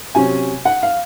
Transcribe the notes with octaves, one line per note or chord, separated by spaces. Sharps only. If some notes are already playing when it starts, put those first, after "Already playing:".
C3 F#3 C#4 G#5
F#5
F5